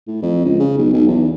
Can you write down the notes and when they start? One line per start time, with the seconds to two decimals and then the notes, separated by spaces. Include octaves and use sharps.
0.07 A2
0.22 F2
0.45 C#2
0.60 C#3
0.78 B1
0.93 B1
1.08 E2